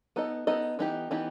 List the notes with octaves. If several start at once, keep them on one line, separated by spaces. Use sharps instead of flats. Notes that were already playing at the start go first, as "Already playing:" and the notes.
B3 D#4 A4 D#5
B3 D#4 A4 D#5
E3 B3 D#4 G4
E3 B3 D#4 G4